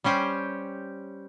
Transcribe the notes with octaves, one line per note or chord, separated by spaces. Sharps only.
G3 C#4 G4 C5